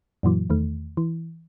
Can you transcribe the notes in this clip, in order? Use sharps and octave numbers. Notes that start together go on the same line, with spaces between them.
F#2 A#2 E3 F#3
E2 D#3 A3
E3